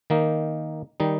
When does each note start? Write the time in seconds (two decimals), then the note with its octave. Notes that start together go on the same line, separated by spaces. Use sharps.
0.10 D#3 A#3 D#4
1.00 D#3 G3 D#4